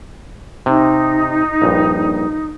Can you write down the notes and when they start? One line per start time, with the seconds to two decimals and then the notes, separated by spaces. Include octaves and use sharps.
0.66 C3 D#4
1.62 A#1 G2